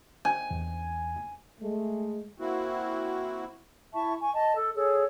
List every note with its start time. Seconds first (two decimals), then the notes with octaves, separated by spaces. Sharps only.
0.25 G#5
0.51 E2
1.60 G#3 A3
2.38 A#3 C4 E4 F#4
3.94 E4 E5 A5 C#6
4.21 G#5 C#6
4.33 D#5 A5
4.57 A4
4.75 G#4 A4 C#5